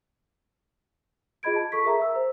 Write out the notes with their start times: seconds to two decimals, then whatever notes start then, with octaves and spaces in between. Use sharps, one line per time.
1.43 F4 G#4 D#5 B5 G#6 D7
1.56 A5
1.72 A4 C#6 B6
1.84 G#4 A#4 E5 A#5
1.99 E5 E6
2.15 C5